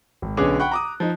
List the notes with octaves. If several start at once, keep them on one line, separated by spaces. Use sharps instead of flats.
G#1
B1 D3 B3 C#4 G#4 D6
F#5 G5 B5 C#6 F#6
A#5 D6 D#6
F3 D#4